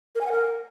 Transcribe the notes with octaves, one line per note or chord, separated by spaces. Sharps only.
A#4
G#5
F#5
A#4